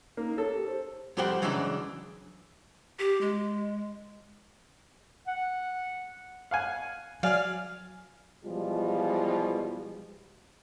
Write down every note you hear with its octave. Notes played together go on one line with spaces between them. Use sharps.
A#3 D#4
A4 C#5
G4
C5
F2 G3 G4 C5 F#5 G5
C#3 E3 F#3 G#3 C#4 D4
G4
G#3
F#5
F5 F#5 G#5
F#3 D5 F5 G#5 F6
B2 E3 F3 G3 G#3 F4